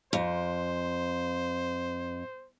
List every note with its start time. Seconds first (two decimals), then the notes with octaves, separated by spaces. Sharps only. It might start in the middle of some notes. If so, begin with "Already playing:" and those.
0.13 F2 C5